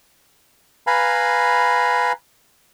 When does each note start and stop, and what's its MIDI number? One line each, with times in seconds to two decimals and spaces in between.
0.87 2.12 71
0.87 2.12 77
0.87 2.12 80
0.87 2.12 82
0.87 2.12 83